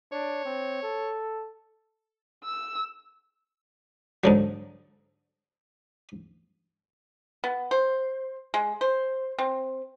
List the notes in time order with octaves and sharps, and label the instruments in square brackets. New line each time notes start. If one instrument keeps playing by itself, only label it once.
[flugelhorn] D4 [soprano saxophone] C#5
[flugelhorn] C4
A4
[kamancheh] E6
[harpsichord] G#2 D3 F#3
[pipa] B3
C5
G#3
C5
C4